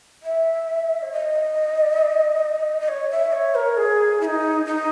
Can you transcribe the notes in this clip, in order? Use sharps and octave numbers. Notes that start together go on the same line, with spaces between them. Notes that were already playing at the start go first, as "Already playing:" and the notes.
E5
C#5
D#5
D#5
C#5
E5
C#5
A#4
G#4
E4
D#4
D#4